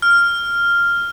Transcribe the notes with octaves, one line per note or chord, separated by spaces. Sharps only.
F6